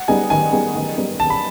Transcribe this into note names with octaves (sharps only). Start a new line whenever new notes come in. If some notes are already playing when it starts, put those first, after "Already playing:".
Already playing: F#5
G3 B3 D#4 G#4 G#5
D#3 G#5
G3 B3 D#4 G#4
D#3
G3 B3 D#4 G#4
D#3 A5
B5